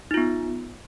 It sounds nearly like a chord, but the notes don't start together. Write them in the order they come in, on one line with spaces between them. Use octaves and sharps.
D#4 F4 B3